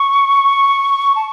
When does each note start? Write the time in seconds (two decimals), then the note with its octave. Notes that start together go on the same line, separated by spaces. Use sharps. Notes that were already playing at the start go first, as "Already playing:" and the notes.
Already playing: C#6
1.16 A5